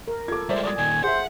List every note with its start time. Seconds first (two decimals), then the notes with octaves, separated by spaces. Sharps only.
0.08 A#4
0.28 F4 A4 D6 G#6
0.49 G3 G#3 C5 D5 E5
0.63 D5 D#6 G#6
0.78 A#2 D#3 G#5
1.04 G#4 C5 E5 F#5